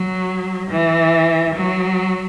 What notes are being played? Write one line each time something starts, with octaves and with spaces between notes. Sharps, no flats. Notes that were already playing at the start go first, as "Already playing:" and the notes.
Already playing: F#3
E3
F#3